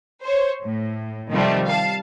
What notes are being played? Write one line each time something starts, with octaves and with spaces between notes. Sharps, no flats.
C5 C#5
A2
C3 D#3 F3 G3 A3 C4
F5 A5